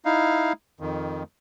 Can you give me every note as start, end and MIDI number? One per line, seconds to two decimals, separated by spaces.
0.05 0.53 63
0.05 0.53 64
0.05 0.53 77
0.80 1.23 41
0.80 1.23 51